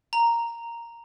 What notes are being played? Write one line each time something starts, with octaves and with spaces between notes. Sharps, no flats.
A#5